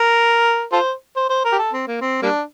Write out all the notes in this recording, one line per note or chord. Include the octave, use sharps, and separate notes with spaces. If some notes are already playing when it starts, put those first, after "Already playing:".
Already playing: A#4
F4 A4 C5
C5
C5
A#4
G4
A4
C4
A#3
C4
G3 A#3 D4